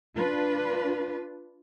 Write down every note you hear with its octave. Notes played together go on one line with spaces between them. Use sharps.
D4 F4 B4